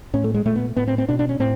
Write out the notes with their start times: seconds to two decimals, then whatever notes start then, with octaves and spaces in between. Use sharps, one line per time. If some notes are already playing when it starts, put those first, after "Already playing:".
0.14 A2 C#4
0.24 A3
0.35 G#3
0.45 A#2 A3
0.56 B3
0.77 A2 B3
0.88 C4
0.98 C4
1.09 B2 D4
1.19 D4
1.29 C#4
1.40 A2 C4